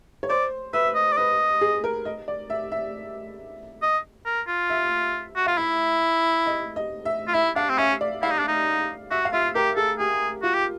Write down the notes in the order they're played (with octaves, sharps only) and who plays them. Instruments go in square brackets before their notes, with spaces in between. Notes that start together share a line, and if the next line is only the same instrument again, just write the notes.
[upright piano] C#5
[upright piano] C5 [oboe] D5
[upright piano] B4 [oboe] E5
[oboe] D#5
D5
[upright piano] B4 [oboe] D#5
[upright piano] G#4
A#4
D#5
D5
E5
E5
[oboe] D#5
A#4
F4
[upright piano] E5
[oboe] F#4
[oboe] F4 [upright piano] F5
[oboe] E4 [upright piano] E5
[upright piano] D#5
D#5
E5
[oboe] F4
[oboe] E4 [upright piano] E5
[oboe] D4 [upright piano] F5
[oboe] C4
[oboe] C#4 [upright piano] E5
[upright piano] D5
[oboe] E4 [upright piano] F5
[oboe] D#4
D4
D#4
[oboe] F#4 [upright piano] E5
[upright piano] F5
[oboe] F4 [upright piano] E5
[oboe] G4 [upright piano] A#4
[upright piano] G#4 [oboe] A4
[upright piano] G4 [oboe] G#4
[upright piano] F4 [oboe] F#4
[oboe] G4